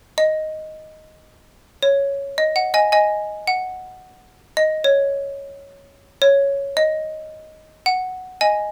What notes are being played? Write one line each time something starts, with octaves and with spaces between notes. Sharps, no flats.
D#5
C#5
D#5
F#5
D#5 G#5
D#5 G#5
F#5
D#5
C#5
C#5
D#5
F#5
D#5 G#5